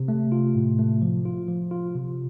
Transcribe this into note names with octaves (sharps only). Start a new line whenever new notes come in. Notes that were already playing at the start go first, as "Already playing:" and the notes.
Already playing: C3
A3
F4
A2
A3
F3
F4
F3
F4
C3